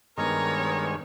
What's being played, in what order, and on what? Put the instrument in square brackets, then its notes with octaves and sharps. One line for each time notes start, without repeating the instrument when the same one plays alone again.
[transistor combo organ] G2 D#3 G#3 [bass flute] B3 [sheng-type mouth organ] A#4 A#5 [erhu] C#5